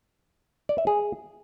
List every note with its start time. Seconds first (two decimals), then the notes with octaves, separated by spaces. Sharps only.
0.69 D5
0.78 E5
0.87 G#4